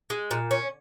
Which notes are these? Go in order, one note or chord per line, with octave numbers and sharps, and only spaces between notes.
G#3
A#2
C#4